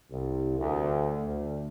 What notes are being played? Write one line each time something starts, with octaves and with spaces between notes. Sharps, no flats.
C2
D2
D2